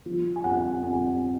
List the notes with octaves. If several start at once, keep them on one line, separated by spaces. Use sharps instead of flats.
F3
G#5
F2 F#5
F2 G#5